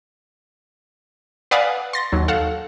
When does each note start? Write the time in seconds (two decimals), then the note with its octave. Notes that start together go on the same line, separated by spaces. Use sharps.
1.51 B4 D5 F5 F#5 G#5 D#6
1.93 C6 A6 A#6
2.12 D#2 F#3
2.28 A4 F5 F#5